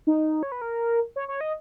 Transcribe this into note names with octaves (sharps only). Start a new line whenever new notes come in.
D#4
C#5
B4
A#4
C#5
C#5
D#5